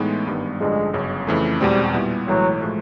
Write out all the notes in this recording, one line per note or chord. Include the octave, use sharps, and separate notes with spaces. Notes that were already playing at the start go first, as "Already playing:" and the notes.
Already playing: A2 E3 G#3 B3 D#4
G#1 G2 D#3 G3 B3
A1 G2 D3 F3 G#3
G1 F#2 C#3
F2 C#3 E3 A3
E2 B2 G3 G#3 C4
A#2 G3 B3 E4
B1 A2 E3 F#3 G#3
A2 F3 G#3